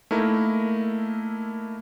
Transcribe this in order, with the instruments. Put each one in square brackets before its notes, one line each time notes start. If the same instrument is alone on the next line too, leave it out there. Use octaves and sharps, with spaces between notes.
[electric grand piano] A3 A#3 D#4 E4 A#4